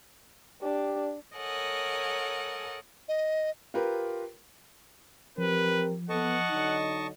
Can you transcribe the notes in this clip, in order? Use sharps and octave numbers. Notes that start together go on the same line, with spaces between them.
D4 G4
A4 A#4 C#5 D#5 F#5 G#5
D#5
F4 G4 A#4 B4
F3 C4 G4 A#4 B4
B3 A4 D#5 F#5 A5 C#6
D3 F#3 D#4